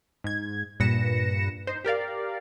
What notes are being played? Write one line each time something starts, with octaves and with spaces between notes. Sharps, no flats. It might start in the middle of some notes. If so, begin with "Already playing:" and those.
G#2 G#6
G2 A#2 B4 A#6 C#7 E7
D#4 C5
G4 A#4 D5 F5